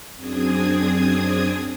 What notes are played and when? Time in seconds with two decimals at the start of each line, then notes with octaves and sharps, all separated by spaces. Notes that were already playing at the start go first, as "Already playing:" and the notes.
0.16 F#2 C4 D4 G#4 D#6 G#6